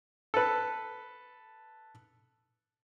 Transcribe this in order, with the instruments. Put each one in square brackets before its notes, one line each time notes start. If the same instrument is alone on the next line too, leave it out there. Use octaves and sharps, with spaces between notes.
[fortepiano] A4 B4